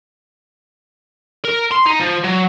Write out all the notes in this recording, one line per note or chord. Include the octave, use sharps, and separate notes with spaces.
A#4
C6
D#4
F3
F#3